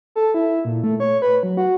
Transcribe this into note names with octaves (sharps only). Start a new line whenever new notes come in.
A4
E4
A#2
A3
C#5
B4
F#3
F#4